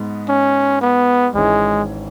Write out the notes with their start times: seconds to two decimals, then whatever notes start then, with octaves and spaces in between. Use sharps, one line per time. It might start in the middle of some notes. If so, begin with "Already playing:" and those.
Already playing: G#2 B3
0.29 C#4
0.81 B3
1.34 G#1 G#2 E3 G#3 C#4